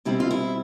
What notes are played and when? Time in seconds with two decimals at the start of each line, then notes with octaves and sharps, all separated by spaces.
0.05 B2 G3 C4 E4
0.20 F4
0.31 E4